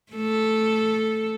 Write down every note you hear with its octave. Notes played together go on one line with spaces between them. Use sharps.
A3 A4